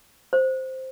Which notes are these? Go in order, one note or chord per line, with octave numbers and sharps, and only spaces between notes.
C5